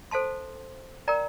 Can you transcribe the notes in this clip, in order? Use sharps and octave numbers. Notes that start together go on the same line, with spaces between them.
A4 C5 F5 A5 C6
A#4 D5 G5 A#5